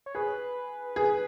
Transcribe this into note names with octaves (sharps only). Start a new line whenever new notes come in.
C#5
G#4 B4
G#4